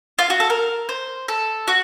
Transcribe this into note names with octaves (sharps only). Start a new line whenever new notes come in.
F4
F#4
A4
A#4
C5
A4
F#4